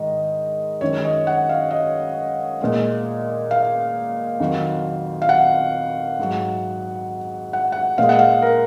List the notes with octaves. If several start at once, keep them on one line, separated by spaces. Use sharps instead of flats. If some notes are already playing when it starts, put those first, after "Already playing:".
Already playing: G#2 D#3 G#3 D#5
F#2 D#3 G#3 C#5
D#5
F#5
F5
D#5
A#2 G#3
F5
F2 D#3 F#3
F5
F#5
G#2 F#3
F#5
F#5
A#2 G#3 F5
F#5
F5
A#4